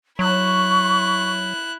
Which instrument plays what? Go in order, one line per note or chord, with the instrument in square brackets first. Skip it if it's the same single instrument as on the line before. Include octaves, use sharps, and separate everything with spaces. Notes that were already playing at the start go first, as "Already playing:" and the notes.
[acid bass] F#3 [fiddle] E4 F#6 [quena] C#6